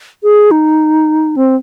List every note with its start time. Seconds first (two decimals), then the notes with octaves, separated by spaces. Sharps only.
0.23 G#4
0.51 D#4
1.36 C4